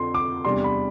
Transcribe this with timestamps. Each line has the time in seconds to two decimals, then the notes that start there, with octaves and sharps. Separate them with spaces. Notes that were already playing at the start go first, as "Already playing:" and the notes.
Already playing: F2 D3 F3 C6
0.14 D6
0.45 E2 C3 G3 D4 C6
0.64 B5